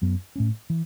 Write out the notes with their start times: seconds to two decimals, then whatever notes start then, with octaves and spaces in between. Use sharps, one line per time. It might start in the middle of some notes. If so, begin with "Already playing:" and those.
0.02 F#2 F#3 B3
0.36 A2 A3 C#4
0.70 E3